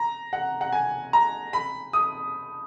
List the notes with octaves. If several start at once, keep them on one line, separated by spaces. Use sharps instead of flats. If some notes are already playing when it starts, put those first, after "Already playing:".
Already playing: A#5
F#5
F#5
G#5
A#5
B5
D#6